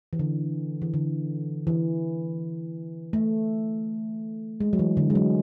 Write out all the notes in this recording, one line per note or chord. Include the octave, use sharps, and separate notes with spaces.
E3
D3
E3
D3
E3
A3
G#3
F#3
E3
D3
G#3
F#3